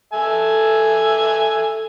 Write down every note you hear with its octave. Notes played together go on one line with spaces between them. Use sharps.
A4 E5 G#5